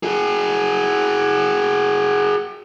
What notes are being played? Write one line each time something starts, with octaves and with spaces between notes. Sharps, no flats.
F#4 G#4